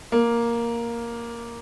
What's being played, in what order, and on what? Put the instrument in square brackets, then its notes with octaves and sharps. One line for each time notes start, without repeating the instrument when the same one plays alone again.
[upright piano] A#3